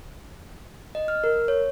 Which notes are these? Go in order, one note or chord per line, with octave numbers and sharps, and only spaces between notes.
D#5
F6
A#4
C#5